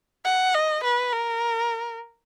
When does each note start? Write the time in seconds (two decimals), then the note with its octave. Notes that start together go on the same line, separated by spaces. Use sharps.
0.25 F#5
0.54 D#5
0.84 B4
1.13 A#4